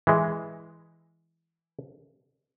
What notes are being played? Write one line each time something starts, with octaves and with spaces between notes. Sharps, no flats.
E3 G#3